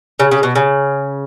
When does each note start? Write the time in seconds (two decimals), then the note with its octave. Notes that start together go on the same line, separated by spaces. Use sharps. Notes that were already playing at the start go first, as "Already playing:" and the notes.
0.20 C#3
0.31 C#3
0.43 B2
0.55 C#3